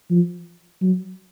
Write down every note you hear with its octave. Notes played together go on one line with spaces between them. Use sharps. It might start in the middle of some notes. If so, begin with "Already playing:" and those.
F3
F#3